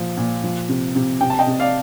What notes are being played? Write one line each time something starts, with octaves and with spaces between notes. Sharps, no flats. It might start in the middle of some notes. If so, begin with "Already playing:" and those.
Already playing: A#2 F3
A#2
F3
C3
C3
C3 G5
A5
D#5 G5
C3
D5 F5